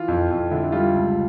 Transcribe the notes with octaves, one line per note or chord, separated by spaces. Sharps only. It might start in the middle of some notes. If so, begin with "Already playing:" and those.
Already playing: E3 F4
F2
F2
D3 E4
G3 F4
C#2